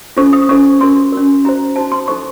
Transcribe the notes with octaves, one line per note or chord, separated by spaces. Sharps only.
C#4 F4 A4 C5 C#6
D#6
C#4 F4 A4 C5 C#6
C#4 F#4 A#4 C6
C#4 F#4 A#4
D#4 F#4 C5 A#5
D#4 F#4 C5 A5
C6
D#4 A4 C5 C#6